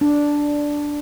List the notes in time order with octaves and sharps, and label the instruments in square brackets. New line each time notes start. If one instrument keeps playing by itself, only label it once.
[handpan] D4